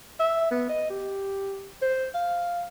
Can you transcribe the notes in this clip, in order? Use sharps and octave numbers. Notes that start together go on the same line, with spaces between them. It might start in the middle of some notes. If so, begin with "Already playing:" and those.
E5
B3
D#5
G4
C5
F5